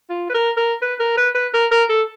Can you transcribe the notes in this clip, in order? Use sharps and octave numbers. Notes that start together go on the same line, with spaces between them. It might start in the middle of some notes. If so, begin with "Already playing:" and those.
F4
B4
A#4
A#4
B4
A#4
B4
B4
A#4
A#4
A4